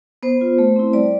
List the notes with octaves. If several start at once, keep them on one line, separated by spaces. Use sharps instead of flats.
B3 C5
F4
A3
C4 E4
G3 D5